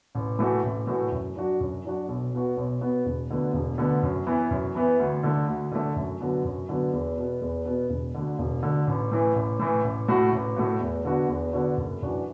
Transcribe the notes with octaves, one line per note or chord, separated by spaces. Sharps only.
A1
A2 E3 A3 F#4
A1
A2 E3 A3 F#4
F#2
F#3 D4 F#4
F#2
F#3 D4 F#4
B1
B2 B3 F#4
B1
B2 B3 F#4
E1
D2 D3 B3
E1
D2 D3 B3
F#2
E3 B3 E4
F#2
E3 B3 E4
D2
D3 A3
D2
D3 A3
F#2
D3 F#3 B3
F#2
D3 F#3 B3
E2
B2 B3
E2
B2 B3
E1
D2 D3
E1
D2 D3
A1
A2 E3
A1
A2 E3
A1
A2 A3 F#4
A1
A2 A3 F#4
E2
D3 B3 D4 F#4
E2
D3 B3 D4 F#4
F#1
F#2 E3 D4 F#4